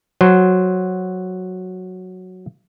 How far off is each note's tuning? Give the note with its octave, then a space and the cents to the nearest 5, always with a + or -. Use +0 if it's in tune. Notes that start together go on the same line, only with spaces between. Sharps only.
F#3 -5 C5 -5